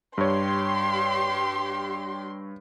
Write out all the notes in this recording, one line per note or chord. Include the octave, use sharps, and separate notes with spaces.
G2 G4 C#5 C6